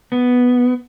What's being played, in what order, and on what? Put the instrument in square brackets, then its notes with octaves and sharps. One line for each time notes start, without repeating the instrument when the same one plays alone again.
[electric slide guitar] B3